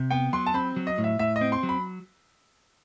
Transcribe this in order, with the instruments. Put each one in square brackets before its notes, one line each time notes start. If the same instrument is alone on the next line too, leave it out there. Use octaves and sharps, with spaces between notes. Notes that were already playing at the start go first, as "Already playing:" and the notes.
Already playing: [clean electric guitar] C3
[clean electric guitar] B3 [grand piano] G5
[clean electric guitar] F#3 [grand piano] C6
[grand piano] A5
[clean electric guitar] C4 [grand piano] B5
[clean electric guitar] F#3
[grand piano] D#5
[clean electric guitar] A2
[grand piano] E5
[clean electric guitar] A2 [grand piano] E5
[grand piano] D#5
[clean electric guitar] C4
[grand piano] C6
[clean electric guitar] F#3
[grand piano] B5